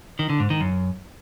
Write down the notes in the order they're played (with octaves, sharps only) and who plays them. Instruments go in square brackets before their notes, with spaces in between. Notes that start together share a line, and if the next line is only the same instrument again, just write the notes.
[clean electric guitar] D#3
D3
G#2
D#3
F#2